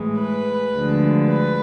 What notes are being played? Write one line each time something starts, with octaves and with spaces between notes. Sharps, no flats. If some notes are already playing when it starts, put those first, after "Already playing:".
Already playing: A2 E3 G#3
B4
D2 D3 F3 G#3
B4